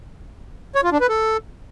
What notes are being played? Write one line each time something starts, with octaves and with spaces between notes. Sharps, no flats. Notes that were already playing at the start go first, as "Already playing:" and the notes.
C#5
F4
D4
B4
A4